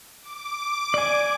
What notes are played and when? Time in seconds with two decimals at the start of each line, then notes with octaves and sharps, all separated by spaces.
0.21 D6
0.94 D5 G#5